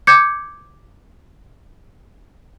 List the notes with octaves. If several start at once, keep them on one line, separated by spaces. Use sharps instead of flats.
D6 G6 G#6 C#7